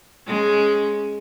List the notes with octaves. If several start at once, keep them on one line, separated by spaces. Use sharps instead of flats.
G#3 C#4